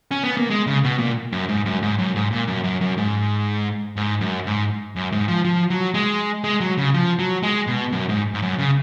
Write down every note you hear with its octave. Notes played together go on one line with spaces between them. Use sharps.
C#4
B3
A#3
G#3
C#3
B2
A#2
F#2
G#2
F#2
G#2
F#2
G#2
A#2
F#2
F#2
F#2
G#2
G#2
F#2
G#2
F#2
G#2
F3
F3
F#3
G#3
G#3
F#3
C#3
F3
F#3
G#3
B2
F#2
G#2
G#2
F#2
C#3